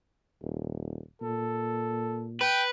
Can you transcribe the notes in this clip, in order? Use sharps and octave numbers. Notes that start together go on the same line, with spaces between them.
D#1
A#2 A4
B4 G5